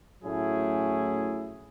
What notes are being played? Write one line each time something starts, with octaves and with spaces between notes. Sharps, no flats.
A2 F#3 A3 C#4 E4 G#4